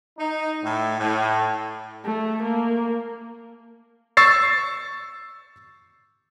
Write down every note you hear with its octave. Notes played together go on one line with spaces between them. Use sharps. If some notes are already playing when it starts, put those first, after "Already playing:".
D#4
A2
A2
A3
A#3
C#6 E6 A6 C7